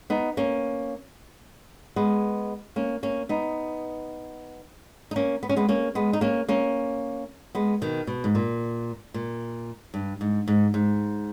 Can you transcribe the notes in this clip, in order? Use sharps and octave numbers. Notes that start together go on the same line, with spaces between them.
B3 D#4
A#3 C#4
G#3 B3
A#3 C#4
A#3 C#4
B3 D#4
D#4
A#3 C#4
B3
C#4
G#3 B3
A#3 C#4
G#3 B3
D#4
A#3 C#4
A#3 C#4
G#3 B3
B2 D#3
B2
G#2
A#2
A#2
G2
G#2
G#2
G#2